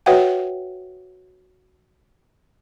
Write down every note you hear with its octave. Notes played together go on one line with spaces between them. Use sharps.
F#4 B4 C#5 E5 F#5 G5